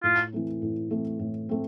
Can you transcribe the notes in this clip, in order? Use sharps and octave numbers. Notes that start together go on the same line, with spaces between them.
A2 F4
E3 A3 C4
A2
E3 A3 C4
A2
A3 C4